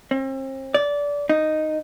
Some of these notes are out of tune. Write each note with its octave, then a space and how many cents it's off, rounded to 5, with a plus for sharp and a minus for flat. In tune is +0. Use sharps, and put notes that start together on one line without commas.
C4 +40
D5 -20
D#4 -5